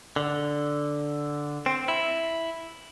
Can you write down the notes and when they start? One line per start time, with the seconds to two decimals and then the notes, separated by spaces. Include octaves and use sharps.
0.16 D3
1.66 C4
1.88 E4